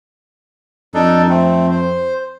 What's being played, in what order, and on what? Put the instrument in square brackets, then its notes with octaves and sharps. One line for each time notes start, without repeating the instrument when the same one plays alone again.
[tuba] F2 [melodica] D4 D#4 A4
[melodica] A3 C4
C5